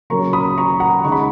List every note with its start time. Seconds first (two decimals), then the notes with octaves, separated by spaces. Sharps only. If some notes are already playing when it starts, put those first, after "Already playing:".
0.10 C#3 F#3 A#3 C#4 A#5 C#6
0.33 B5 D#6
0.58 A#5 C#6
0.80 F#5 A#5
1.04 C#3 G#3 D#4 C#6
1.12 B5